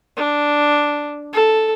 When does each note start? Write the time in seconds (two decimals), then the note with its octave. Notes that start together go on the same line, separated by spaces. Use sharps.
0.17 D4
1.33 A4